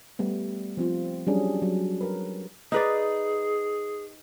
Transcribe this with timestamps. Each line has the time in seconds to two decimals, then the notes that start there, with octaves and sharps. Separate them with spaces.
0.19 G3 A3 B3
0.77 F3 C4 F4
1.27 F#3 G3 C#4 D4 G#4
1.62 F#3
2.01 A#4 B4
2.72 D#4 G#4 B4 D5